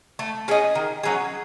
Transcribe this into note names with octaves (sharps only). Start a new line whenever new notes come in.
A3
C#4 G#4 D#5
D#3
F#3 C#4 G#4